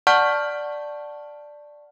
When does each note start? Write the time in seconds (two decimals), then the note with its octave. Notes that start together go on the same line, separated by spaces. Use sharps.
0.07 D5 F#5 A5 C#6 F6 G6